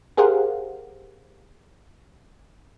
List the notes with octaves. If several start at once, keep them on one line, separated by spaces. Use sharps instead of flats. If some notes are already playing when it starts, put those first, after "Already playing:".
G4 G#4 A#4 C5 F5 F#5